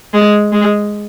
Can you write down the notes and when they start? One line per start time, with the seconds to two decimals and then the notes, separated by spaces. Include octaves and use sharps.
0.14 G#3
0.53 G#3